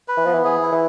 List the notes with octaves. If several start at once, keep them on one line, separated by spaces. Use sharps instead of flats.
B4
E3
F3 B3
E3
E3 G#4
E4
E3